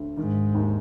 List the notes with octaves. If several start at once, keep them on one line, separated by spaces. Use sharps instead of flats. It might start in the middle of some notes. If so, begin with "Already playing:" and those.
Already playing: D2
G#2 D#3
D#2